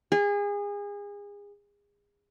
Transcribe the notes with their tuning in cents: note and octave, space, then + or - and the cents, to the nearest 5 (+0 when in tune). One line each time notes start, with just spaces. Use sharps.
G#4 -30